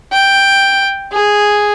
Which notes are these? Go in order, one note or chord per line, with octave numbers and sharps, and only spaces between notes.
G5
G#4